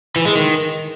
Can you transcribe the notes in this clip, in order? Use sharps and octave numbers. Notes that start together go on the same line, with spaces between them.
E3
G#3
D#3